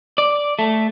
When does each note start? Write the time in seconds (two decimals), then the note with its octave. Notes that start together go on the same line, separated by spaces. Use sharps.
0.18 D5
0.59 A3